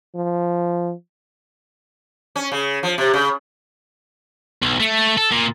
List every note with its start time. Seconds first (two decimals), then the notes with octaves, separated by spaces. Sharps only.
0.15 F3
2.36 C#4
2.52 C#3
2.83 F3
2.98 C3
3.14 C#3
4.62 B1
4.80 A3
5.18 A4
5.32 A#2